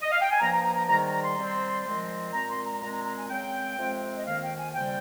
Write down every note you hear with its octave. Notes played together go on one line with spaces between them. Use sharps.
D#5
F5
G5
G#5
G2 F3 A#3 A#5
A#5
A#5
A#5
G#2 D#3 G3 A#5
A#5
A#5
C6
C3 G3 C4
A#2 F3 G#3 C4
A#2 G#3 C4 A#5
C6
A#5
A#2 G#3 C4 A#5
A#5
A#5
G#5
C#3 G#3 C4 G5
F2 C3 F3 G#3 C4
D#5
F2 D#3 A#3 F5
G5
G#5
F2 C#3 G3 C4 G5